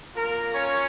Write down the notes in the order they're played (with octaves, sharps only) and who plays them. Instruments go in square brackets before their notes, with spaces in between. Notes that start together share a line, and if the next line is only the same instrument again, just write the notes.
[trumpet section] A#3 F4 A#4
C#4 C#5